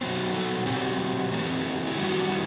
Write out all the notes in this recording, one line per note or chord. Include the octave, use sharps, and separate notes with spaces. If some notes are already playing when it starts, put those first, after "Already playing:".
B2 F#3 B3 C5
A4
B2 F#3 C4 G4
E3 A3 C4
E4
D#3 G3 B3 F#4
E4